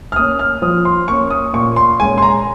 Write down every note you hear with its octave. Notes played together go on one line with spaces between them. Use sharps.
F6
A#3 C#4 D#6
F6
F3 D#6
C6
A#3 C#4 C#6
D#6
A#2 C#6
C6
G#3 C#4 G#5
C6
A#5